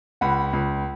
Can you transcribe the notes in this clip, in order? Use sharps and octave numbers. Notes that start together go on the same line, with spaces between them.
C#2 F#5 B5
C#2